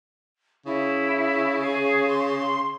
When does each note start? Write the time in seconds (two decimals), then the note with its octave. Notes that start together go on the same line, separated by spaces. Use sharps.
0.66 C#3 E4
1.61 G#4
2.07 C6